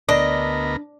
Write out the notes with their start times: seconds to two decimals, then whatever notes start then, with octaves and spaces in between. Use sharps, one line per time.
0.09 D2 B3 D4 A#4 D#5